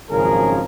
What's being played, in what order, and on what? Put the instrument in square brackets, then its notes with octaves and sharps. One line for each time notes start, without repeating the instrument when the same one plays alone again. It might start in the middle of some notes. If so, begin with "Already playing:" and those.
[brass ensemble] G#1 F#2 C#3 F3 G#4 A#4